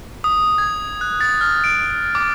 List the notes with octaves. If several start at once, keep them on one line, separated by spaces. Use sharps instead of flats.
D#6
G#6
F#6
A6
F6
D7
D6